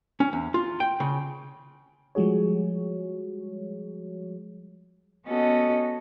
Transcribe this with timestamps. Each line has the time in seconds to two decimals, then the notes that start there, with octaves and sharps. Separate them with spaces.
0.20 C#4
0.33 E2
0.54 F4
0.80 G5
1.00 C#3
2.15 F3 G3 G#3 F#4 G#4 C#5
5.26 B3 C#4 F#4 A4 D#5